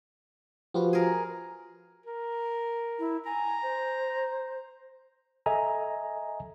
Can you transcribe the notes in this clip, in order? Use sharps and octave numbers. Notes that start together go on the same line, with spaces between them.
F3 F#4 G4 B4
G#4 A#4
A#4
E4
G#5 A#5
C5
A4 D#5 E5 G#5 A#5